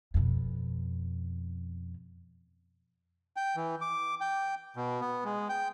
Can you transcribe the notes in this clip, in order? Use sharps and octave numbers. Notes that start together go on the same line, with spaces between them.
F2 B2
G5
E3
D6
G5
B2
B3
G#3
G5